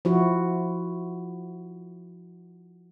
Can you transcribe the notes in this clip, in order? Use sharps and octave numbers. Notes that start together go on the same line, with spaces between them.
F3 E4 F#4